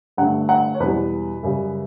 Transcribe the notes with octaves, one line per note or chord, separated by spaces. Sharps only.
G2 D3 A3 F#5
F#5
C#5
E2 B2 G3 B4
F#2 C#3 G3